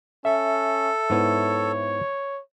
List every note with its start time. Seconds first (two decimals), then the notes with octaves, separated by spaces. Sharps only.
0.25 C#4 A4 E5
1.10 G#2 B3 E4 C#5